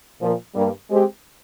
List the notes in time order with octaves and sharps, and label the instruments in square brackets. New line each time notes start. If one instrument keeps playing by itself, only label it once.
[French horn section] A#2 F3 A#3
G2 G3 A#3
G#3 C4 G4